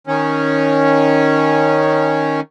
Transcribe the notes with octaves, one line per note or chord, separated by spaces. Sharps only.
D#3 C#4